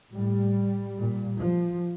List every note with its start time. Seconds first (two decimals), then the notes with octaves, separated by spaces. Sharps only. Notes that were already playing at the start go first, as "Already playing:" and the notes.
0.14 A2 G3
0.98 A#2
1.39 F3